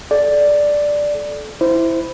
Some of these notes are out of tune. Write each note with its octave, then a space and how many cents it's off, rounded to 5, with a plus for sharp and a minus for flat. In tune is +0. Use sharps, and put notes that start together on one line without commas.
A4 -30 D5 +0
E4 +0 C5 -15